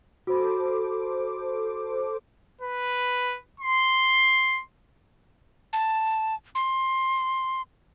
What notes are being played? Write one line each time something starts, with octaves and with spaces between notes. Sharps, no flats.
F#4 A4 C5 B5 D6
B4
C6
A5
C6